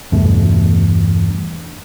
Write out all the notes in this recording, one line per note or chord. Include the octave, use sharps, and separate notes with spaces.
E2 G2 B2 A3